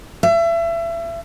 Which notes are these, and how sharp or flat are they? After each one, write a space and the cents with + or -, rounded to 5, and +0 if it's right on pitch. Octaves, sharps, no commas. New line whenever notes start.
E5 +30